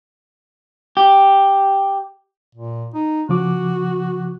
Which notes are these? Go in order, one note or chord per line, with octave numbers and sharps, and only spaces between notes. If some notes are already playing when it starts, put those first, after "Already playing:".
G4
A#2
D#4
C#3 F3 F#4 D6